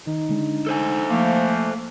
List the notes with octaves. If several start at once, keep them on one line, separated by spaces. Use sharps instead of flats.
D#3 D#4
D3 G#3 D4
A4 C5 G#5
F3 A3 A#3 D6